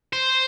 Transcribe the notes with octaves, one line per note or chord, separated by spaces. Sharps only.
C5